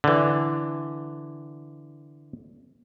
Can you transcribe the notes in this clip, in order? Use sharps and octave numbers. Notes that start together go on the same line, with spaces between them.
D3 E3